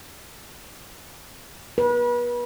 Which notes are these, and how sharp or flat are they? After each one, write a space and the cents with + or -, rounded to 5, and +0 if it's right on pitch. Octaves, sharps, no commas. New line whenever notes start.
B4 -35